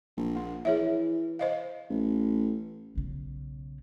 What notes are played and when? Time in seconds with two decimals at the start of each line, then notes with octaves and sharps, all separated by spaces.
0.17 A#1
0.35 A#3 D4
0.65 E3 G#4 C#5 E5
1.39 C5 D#5 F5
1.89 A1
2.95 B1 C#3